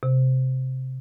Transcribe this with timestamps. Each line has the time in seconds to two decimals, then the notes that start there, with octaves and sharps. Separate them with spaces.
0.03 C3